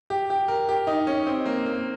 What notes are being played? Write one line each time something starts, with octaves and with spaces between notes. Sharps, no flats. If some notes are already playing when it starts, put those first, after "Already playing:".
G4
G4
A#4
G4
D#4
C#4
C4
A#3
A#3